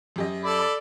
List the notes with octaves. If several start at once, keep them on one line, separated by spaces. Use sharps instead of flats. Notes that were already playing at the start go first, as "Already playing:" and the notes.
F#2 G4 D#5
A4 D5 B5